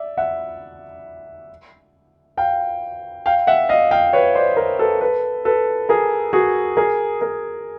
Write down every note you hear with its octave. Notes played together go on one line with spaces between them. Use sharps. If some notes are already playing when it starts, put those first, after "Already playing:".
Already playing: D5 E5
E5 F#5
F5 G5
F5 G5
E5 F#5
D#5 F5
F5 G5
B4 C#5
C5 D5
A#4 C5
A4 B4
A4 B4
A4 B4
G#4 A#4
F#4 G#4
G#4 A#4
G#4 A#4